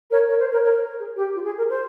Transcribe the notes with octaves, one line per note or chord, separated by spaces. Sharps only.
A#4 C#5
A#4 C#5
C5
A#4 C#5
A#4 C#5
G#4
G4
F4
G#4
A#4
C5